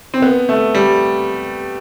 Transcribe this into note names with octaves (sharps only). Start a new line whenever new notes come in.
C4
B3
A3
G3